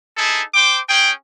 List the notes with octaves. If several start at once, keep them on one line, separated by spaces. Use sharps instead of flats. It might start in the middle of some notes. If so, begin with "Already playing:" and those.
D#4 E4 G#4 A4
C5 G5 D6
C#4 G#4 G5